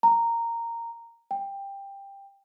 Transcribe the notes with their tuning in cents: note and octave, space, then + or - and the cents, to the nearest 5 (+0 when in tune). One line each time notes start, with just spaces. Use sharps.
A#5 -10
G5 +15